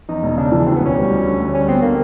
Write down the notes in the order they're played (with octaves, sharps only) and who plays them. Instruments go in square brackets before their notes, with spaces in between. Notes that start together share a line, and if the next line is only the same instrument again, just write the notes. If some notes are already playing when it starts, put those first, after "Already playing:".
[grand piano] E2 [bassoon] D#4
[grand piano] E1
[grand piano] C#3 [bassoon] D4
[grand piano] E3
[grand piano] D2 [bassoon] C4
[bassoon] B3
[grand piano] E1 [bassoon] C#4
[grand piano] G3
D2
D3
D2
[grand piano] G3 [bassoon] C#4
[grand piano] B3 [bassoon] C4
[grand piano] D3 [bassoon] A#3